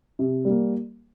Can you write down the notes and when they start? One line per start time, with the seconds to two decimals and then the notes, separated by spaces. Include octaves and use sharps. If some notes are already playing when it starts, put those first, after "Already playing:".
0.19 C3
0.45 G3 A#3